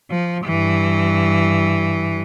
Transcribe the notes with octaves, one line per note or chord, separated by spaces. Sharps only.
F3
G2 E3